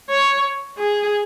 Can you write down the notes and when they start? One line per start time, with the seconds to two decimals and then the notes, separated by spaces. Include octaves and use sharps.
0.10 C#5
0.77 G#4